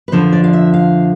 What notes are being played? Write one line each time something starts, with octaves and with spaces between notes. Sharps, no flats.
B4
F2 D3 F3 C5
D5
F5
E5
F5